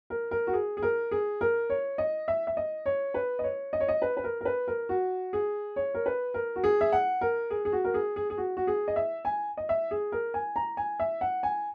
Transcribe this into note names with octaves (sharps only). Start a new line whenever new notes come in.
A#4
A#4
F#4
G#4
G#4
A#4
G#4
A#4
C#5
D#5
E5
E5
D#5
C#5
B4
D#5
C#5
D#5
C#5
D#5
B4
B4
A#4
A#4
B4
A#4
F#4
G#4
C#5
A#4
B4
A#4
F#4
G#4
E5
F#5
A#4
G#4
G#4
F#4
A#4
G#4
G#4
G#4
F#4
F#4
G#4
D#5
E5
G#5
D#5
E5
G#4
A#4
G#5
A#5
G#5
E5
F#5
G#5